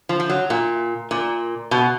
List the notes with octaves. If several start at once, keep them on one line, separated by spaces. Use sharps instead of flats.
F3
F3
F#3
A#2
A#2
B2